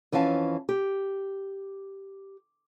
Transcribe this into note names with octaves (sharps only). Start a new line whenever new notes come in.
F2 E3 C#4 F5 A5
G4